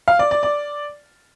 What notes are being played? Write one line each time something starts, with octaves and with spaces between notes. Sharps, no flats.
F5
D5
D5
D5